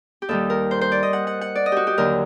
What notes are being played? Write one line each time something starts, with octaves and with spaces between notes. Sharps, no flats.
G4
D#2 D#3 G3 A4
A#4
C5
C5
D5
D#5
F#5
F#5
F#5
D5
D#5
F#4 G4
G4
D#2 D3 F#3 A#4